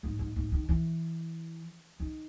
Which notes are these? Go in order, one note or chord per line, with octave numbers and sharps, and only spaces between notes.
G#2
G#2
G#2
D#3
E3
D#3